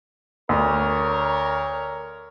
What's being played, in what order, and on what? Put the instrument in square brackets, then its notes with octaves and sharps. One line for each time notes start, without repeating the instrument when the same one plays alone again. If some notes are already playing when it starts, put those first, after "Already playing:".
[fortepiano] D2 [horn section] A#4 C#5